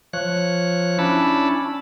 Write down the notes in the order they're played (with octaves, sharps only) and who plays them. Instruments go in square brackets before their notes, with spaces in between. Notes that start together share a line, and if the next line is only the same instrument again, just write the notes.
[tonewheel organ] F3 C#5 F#6
C#4 D4 E4 A5 B5